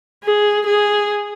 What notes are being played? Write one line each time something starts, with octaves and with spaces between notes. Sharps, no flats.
G#4
G#4